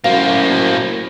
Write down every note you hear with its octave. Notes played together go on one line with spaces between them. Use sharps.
F#2 A2 A#3 C5 F5